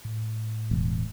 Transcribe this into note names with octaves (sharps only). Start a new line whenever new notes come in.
A2
E1